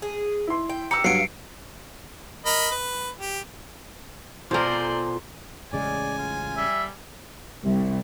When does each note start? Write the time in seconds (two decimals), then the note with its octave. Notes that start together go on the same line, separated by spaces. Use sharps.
0.02 G#4
0.47 E4 C6
0.69 G5
0.91 G4 F#5 A#5 E6 C#7
1.04 G2 F#3 F5 C7 D7
2.46 A#4 D#5 B5
2.71 B4
3.20 G4
4.51 B2 F4 A4 A#4 C5 D5 G#5 C6
5.73 A1 C#3 G#3 D5 G#5
6.18 F4
6.57 G3 E5
7.64 C2